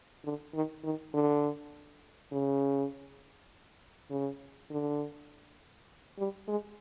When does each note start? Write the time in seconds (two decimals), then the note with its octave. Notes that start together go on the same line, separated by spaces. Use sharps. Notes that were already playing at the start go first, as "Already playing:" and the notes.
0.25 D3
0.54 D#3
0.84 D#3
1.14 D3
2.32 C#3
4.10 C#3
4.70 D3
6.18 G3
6.48 G#3